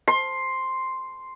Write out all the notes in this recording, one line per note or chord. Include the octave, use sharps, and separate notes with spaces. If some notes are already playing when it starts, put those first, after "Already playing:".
C6